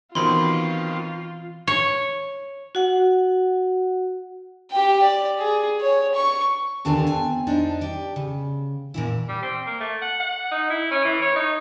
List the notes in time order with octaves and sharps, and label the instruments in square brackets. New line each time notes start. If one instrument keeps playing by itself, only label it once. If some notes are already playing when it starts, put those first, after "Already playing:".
[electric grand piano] B2 D#3 C4 [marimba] E3 [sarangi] F4 [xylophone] B5 C6
[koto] C#5
[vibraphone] F#4 F#5
[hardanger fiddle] G4 G5
D5
G#4
C#5
C#6
[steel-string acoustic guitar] D#2 D3 D4 F4 A4 G#5
C4 G#5
F2 F3 D4 D#4
G4 D5
C#3
A#2 E3 E4
[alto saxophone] G3
C4
A#3
A3
F#5
F#5
D#4
E4
C#4
E3
C#5
D#4